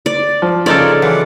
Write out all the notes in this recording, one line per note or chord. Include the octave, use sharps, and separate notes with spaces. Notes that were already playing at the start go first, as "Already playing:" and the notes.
D5
F3
C#3 D#4 F4 A4 A#4 C#5 D5
E3 F#3 F#5 D6